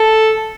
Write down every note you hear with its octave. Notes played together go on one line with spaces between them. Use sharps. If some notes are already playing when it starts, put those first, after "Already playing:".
Already playing: A4